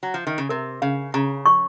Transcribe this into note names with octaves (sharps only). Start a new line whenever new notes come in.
F#3
F3
D#3
C#3
C3 A#4
C#3 F5
C#3 A#5
C#6